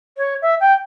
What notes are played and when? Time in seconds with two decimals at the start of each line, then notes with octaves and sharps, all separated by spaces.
0.17 C#5
0.41 E5
0.60 G5